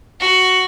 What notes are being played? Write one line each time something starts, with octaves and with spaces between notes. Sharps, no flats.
F#4